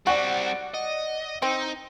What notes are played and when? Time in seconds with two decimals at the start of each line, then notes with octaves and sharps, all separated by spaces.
0.07 G3 C4 F#4 D5 F#5
0.74 D#5
1.42 C4 D#4